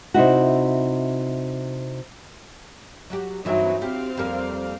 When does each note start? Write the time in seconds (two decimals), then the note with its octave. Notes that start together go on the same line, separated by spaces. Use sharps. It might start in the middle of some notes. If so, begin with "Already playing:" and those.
0.14 C3 D#4 E4 F#4
3.10 F#3 F#4 G4
3.45 G2 E3 F#3 C4 D#4 E5
3.82 C4 G4 F5
4.17 F2 G3 A#3